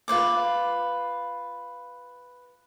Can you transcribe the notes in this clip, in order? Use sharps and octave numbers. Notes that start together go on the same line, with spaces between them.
F4 B4 C5 D6